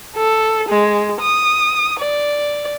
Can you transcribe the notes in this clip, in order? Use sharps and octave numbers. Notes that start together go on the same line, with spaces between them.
A4
G#3
D#6
D5